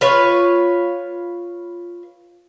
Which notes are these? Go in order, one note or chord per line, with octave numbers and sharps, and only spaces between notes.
F4 B4 C#5